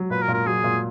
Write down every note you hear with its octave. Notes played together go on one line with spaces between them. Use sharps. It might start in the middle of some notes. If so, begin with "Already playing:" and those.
Already playing: F#3
A#2 B4
A#4
A#2
A#4
F#3 G#4
A#2